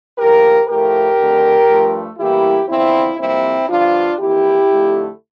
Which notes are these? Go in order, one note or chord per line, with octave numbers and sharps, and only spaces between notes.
A2 F3 A#3 G4 A#4
A2 F3 A3 G4 A#4
F2 D3 A3
G2 F3 A3
A2 E3 G3 A#3 E4 G4
E2 D3 F3 C4 E4
F2 C3 G3 A#3 C4 E4
G2 D3 F3 D4 F4
F2 E3 A#3 E4 G4
F2 D3 A3